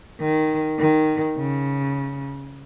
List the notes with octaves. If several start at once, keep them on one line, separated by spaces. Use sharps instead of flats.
D#3
D#3
C#3